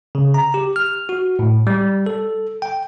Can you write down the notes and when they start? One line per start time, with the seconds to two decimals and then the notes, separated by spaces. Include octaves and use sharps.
0.15 C#3
0.34 A#5
0.54 G4
0.76 F6
1.09 F#4
1.39 A2
1.67 G3
2.06 A4
2.62 G5